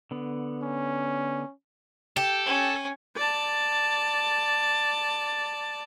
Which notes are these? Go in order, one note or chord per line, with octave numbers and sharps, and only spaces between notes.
D3 B3
C#4
G4 A4
C#4
D5 A5